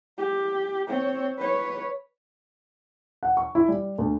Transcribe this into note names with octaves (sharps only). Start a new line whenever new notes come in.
G4
C4 C#5
B4 C#5
F#5
C#6
E4
G3
D2